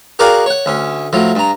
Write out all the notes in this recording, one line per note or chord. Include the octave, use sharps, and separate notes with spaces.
F#4 G#4 A#4 D5 F5 G5
C#5 F#5
D2 C#4
A2 F3 F#3
G2 A#5